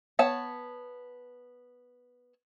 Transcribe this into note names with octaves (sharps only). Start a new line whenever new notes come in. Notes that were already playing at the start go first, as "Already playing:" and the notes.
B3 C#5 F#5 A5